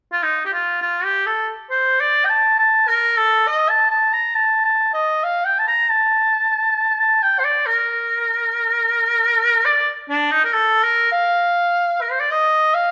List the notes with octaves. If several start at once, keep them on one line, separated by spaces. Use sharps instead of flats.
F4
D#4
G4
F4
F4
G4
A4
C5
D5
G5
A5
A5
A#4
A4
D#5
A5
A5
A#5
A5
A5
D#5
F5
G5
A5
A#5
A5
A5
G5
C5
D5
A#4
D5
D4
D#4
A#4
A4
A#4
F5
A#4
C5
D5
D#5
F5